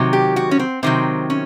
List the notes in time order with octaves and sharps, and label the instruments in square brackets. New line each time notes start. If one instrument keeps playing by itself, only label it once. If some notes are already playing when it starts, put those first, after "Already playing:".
Already playing: [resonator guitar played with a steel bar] C3 D#3 F#3
G4
F#4
C#4
C4
C3 D#3 F#3 C4
C#4